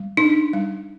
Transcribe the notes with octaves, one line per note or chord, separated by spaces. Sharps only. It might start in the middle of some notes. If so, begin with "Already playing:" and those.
Already playing: G3
D4 D#4
G3